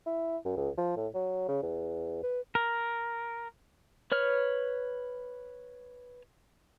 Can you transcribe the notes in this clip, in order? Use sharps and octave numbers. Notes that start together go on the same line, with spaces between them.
E4
F#2
C#2
F3
A2
F#3
C#3
E2
B4
A#4
B4 C#5 F6